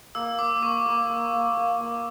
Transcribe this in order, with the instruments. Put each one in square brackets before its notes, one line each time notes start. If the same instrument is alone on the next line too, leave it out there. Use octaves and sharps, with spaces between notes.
[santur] A#3 [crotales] E6
[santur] A#3 [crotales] D6
[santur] A#3 [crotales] C#6
[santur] A#3
A#3
A#3
A#3
A#3